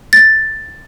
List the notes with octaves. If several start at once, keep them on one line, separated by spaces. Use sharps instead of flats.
A6